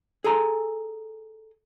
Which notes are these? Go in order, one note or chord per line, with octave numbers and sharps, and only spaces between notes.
G#4 A4 G#5 A#5 C6